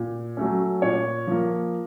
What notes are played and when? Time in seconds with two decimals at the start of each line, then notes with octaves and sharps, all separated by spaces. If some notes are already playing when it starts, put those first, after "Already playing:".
Already playing: A#2
0.37 F#3 A3 C#4
0.82 A#2 C#5
1.27 F3 A#3